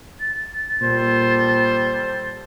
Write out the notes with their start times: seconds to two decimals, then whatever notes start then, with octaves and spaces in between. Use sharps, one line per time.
0.20 A6
0.81 A#2 G3 A4 C5